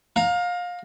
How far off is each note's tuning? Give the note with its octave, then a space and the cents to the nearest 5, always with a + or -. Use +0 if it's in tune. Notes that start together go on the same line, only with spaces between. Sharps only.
F5 +25 A#5 +0